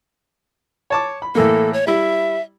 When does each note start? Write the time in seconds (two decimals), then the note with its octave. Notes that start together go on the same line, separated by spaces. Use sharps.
0.90 C#5 A5 D6
1.22 B5
1.35 A2 E3 A#3 A4
1.73 C#5
1.87 G3 E4 E5